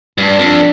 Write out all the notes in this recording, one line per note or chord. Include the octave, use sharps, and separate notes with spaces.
G2 D4
F2